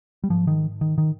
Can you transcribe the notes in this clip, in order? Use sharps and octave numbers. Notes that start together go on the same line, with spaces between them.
G3
G#2 F3
D#3
D#3
D#3